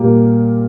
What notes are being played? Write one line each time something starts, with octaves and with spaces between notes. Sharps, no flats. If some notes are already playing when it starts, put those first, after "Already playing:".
Already playing: A#2 G3 A#3 G4